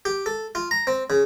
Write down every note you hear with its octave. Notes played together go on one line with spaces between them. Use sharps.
G4
A4
F4
A#5
C4
C#3